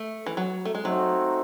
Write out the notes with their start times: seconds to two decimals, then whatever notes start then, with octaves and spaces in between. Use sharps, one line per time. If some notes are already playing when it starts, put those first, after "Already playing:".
Already playing: A3
0.26 E3
0.37 F#3
0.65 A3
0.75 G#3
0.85 F#3 A3 C4 D#4 F#4